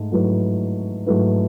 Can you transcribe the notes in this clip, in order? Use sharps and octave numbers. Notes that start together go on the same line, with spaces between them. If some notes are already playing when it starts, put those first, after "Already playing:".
Already playing: G#2 A3
G#2 F#3 A3 E4 B4
G#2 F#3 A3 E4 B4